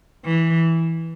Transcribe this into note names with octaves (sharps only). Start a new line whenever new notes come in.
E3